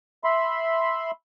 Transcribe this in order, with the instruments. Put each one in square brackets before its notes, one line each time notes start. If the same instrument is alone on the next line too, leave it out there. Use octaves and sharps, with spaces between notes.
[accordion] E5 B5 C6